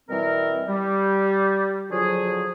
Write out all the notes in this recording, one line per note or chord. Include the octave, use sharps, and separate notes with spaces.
B2 E3 G3 C4 A#4
G3
D3 F3 F#3 F#4 G#4